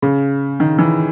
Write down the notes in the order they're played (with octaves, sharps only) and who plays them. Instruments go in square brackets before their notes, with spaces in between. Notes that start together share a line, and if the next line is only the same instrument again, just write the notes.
[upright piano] C#3
D#3
E3